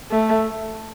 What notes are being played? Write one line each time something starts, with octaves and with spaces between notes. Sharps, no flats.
A3